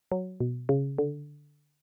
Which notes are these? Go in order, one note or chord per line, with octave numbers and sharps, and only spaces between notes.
F#3
B2
C#3
D3